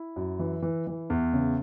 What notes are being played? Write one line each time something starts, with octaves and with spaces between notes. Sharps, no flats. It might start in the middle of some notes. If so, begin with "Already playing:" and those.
Already playing: E4
F#2
E3
E3
E3
E2
C#3